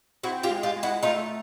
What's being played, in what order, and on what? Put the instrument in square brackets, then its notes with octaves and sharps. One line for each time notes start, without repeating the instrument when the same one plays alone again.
[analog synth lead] C4 [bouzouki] E4 F#4
[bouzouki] F4 G4
[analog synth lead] G#3
[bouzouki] F4 G4
[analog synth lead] G#3
[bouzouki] E4 F#4
[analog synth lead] A3 [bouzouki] D#4 F4